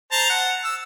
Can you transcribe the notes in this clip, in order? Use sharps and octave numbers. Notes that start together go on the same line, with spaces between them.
C5 A5 A#5
F#5
E6